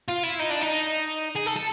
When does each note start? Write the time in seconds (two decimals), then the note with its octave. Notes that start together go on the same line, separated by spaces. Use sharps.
0.09 F4
0.24 E4
0.40 D#4
0.51 D4
0.62 D#4
1.35 G#4
1.46 A4
1.56 A4